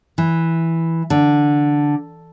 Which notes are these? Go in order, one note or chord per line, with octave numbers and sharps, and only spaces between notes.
E3
D3